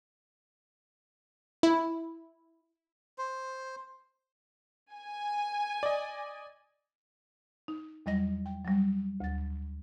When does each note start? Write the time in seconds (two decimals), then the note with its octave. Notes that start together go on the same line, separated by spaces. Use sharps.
1.63 E4
3.18 C5
4.95 G#5
5.83 D5 D#5
7.68 D#4
8.06 E2 F#3 G3 D#5 A#6
8.46 G5
8.65 F#3 G3
9.20 D2 A6